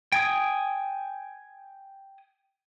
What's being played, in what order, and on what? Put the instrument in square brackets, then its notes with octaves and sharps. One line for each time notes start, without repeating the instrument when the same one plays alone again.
[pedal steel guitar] G5 G#5 D#6